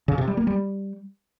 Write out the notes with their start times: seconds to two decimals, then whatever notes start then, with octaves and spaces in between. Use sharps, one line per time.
0.08 C#3
0.18 C3
0.28 G3
0.37 A#3
0.47 G3